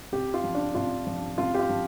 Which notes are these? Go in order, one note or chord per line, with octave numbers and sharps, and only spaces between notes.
C3 G4
F4
F3
D4
C3 F4
F3
C3 F4
G4
F4
F3